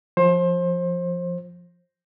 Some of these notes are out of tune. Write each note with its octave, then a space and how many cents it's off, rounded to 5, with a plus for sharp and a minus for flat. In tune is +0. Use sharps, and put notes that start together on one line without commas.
F3 +0 C5 +25